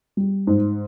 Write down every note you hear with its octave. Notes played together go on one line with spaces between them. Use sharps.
G3
G#2